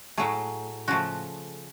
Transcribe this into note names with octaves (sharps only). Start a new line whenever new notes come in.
A2 F#3 A3 G#4
C#3 F3 A3 F#4